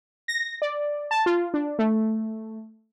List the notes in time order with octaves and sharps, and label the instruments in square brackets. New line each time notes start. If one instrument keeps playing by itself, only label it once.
[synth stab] A#6
D5
A5
F4
D4
A3